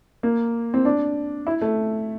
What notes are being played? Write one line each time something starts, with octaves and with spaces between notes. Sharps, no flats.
A#3
C4
D4
E4
A3